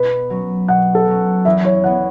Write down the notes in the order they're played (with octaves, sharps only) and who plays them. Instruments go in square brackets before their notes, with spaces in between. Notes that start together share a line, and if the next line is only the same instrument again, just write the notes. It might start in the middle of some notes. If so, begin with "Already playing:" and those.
Already playing: [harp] B2 [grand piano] B4
[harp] F#3 C#4
[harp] B2 [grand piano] F#5
[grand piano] A4
[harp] F#3 C#4
[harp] E2 [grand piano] E5
[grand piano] C#5
[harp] E3 B3 [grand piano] F#5